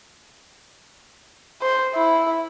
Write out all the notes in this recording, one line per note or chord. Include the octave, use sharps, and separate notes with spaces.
C5
E4